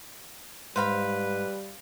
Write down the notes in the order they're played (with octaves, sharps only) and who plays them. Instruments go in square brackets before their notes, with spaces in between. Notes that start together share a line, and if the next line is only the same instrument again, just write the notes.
[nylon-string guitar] G#2 [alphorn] G3 [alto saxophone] B4 [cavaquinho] C5 F5 B5